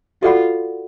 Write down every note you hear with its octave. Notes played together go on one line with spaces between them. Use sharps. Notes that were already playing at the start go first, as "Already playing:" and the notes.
F4 F#4 A4 D5 F#5 B5